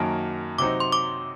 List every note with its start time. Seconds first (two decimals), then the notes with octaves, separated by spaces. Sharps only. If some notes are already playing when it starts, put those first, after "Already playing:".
Already playing: F#2 D#3 F#3 A#3 A5
0.58 C3 F#3 C4 D#4 D6
0.80 C6
0.92 D6